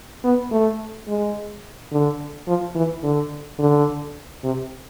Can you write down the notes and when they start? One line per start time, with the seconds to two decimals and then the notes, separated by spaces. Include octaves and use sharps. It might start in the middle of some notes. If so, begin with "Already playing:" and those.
0.24 B3
0.51 A3
1.08 G#3
1.92 D3
2.47 F3
2.75 E3
3.03 D3
3.59 D3
4.43 C3